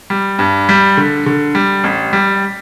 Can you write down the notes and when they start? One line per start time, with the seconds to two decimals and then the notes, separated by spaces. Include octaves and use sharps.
0.10 G3
0.39 G2
0.69 G3
0.97 D3
1.26 D3
1.55 G3
1.84 A1
2.13 G3